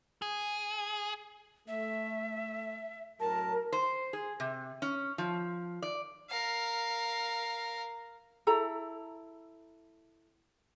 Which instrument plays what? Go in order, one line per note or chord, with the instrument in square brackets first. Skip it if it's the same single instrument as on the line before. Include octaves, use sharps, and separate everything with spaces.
[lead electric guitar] G#4
[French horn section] A3 [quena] E5
[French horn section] F#2 A2 F#3 [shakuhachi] A#4 [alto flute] A5
[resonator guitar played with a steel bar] C5
G#4
C3
C#4
F3
D5
[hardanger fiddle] A#4 F5
[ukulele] E4 A4 A#5